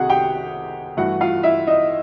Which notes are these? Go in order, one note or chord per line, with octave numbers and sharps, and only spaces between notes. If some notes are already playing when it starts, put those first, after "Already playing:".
Already playing: C2 C3 D#3 F#4 G#4 F#5
G4 G5
G2 E3 A3 F#4 F#5
F4 F5
E4 E5
D#4 D#5